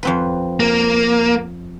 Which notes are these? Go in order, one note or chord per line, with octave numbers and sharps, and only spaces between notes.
F2 C4 B4
A#3